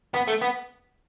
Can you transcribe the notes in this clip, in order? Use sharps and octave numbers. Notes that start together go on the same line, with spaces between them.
B3
A3
B3